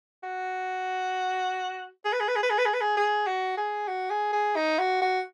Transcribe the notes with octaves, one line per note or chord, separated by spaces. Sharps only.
F#4
G#4
B4
G#4
B4
G#4
B4
G#4
B4
G#4
B4
G#4
G#4
F#4
G#4
F#4
G#4
G#4
D#4
F#4
F#4